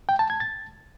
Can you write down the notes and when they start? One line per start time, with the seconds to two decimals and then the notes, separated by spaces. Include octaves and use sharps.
0.09 G5
0.19 A5
0.30 G#6
0.40 A6